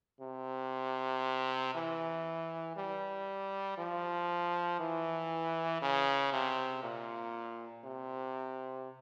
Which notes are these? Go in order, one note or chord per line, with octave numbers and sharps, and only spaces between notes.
C3
E3
G3
F3
E3
C#3
C3
A#2
C3